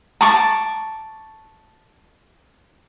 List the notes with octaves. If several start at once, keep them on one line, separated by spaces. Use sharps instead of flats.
A5 C#6 D6